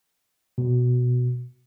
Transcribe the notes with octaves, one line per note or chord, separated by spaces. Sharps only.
B2